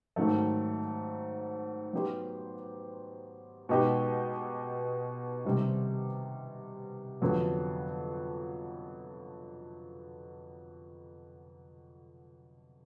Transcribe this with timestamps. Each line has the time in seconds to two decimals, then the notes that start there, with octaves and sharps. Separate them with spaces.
0.16 G#2 D#3 F#3 A3
1.93 F#3 B3 D#4 G4 C5
3.69 B2 G#3 B3 D#4 G4
5.45 C3 D#3 G3 C4 D#4
7.22 F2 D3 F#3 B3